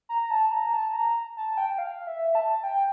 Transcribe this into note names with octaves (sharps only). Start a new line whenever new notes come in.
A#5
A5
A#5
A5
A#5
A5
G5
F5
E5
A5
G5